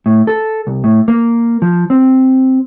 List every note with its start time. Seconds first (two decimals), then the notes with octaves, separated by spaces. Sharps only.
0.06 A2
0.27 A4
0.67 C2
0.84 A2
1.08 A#3
1.62 F3
1.90 C4